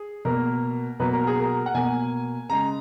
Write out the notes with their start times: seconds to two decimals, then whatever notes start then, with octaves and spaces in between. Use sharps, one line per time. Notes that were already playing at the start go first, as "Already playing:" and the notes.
Already playing: G#4
0.25 B2 A#3 A#4
1.00 B2 F#3 A#3 B4
1.13 A#4
1.27 G#4
1.40 A#4
1.66 F#5
1.74 B2 A#3 G#5
2.50 C#3 G#3 A#5